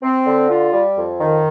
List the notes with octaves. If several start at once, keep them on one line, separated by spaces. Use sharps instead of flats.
C4
D3
F4
G3
F2
D#3